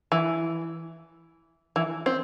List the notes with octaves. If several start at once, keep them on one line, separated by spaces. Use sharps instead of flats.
E3
E3
C4